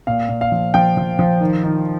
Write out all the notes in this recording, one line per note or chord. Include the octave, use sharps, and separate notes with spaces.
A#2 F5
A#2
F5
F3
F3 G5
F3
F3
D#3
D#3